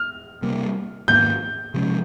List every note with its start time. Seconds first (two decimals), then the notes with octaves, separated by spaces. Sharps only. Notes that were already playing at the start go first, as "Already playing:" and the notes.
Already playing: F6
0.42 C3 G3 A#3
1.08 G#2 D#3 A#3 G6
1.74 C3 F3 G#3 C#4